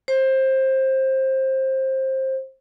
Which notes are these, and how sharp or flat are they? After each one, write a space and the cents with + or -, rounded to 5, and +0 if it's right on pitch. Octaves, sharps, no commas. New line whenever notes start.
C5 +20